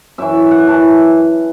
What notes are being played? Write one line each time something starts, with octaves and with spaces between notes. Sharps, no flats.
F#2 E3 E5
F#5
F#2 E3 A5